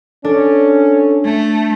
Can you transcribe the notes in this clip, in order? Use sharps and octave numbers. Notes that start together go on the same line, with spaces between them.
C#4 D4 A4
A3